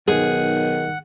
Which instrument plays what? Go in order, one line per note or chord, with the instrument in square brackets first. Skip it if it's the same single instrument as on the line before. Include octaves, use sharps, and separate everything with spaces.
[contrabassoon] B1 [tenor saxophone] D#3 [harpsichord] G#4 [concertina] F#5